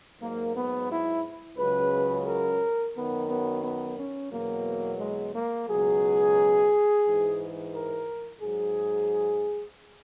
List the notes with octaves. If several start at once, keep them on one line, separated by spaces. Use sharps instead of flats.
G#2 F#3 A#3
B3
E4
C#2 C#3 F#3 B4
A#4
F#2 D#3 F#3 B3
B3
B3
C#4
E2 B2 F#3 A#3
G#3
A#3
C#2 B2 F#3 G#4
G#2 E3
A#4
G#2 F#3 G#4